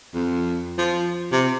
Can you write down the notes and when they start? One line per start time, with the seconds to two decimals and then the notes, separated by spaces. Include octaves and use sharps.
0.14 F2
0.78 F3
1.32 C3